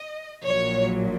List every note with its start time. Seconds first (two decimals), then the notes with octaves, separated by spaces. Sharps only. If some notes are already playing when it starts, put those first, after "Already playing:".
Already playing: D#5
0.44 A#1 A#2 F#3 C#5